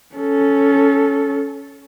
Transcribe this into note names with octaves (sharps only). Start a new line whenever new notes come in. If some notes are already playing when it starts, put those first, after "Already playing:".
C#4 A4